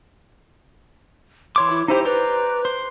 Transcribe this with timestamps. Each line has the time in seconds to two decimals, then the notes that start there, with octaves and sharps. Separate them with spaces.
1.56 E3 C#5 C6 D6
1.70 E4
1.88 D#4 E4 G4 C5
2.05 B4 C5 D5 A#5
2.65 C5